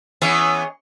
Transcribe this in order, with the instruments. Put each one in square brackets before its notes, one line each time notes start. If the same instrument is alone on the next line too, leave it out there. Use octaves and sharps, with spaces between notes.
[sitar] E3 B3 C#4 [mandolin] G#4 C#5 D#5